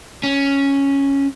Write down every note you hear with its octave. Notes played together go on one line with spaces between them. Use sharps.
C#4